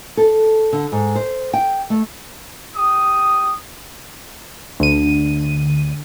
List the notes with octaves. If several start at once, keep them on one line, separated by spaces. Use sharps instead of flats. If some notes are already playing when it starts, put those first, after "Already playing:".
A4
D3
G#2
C5
G5
A3
G4 D#6
D2 D3 D#7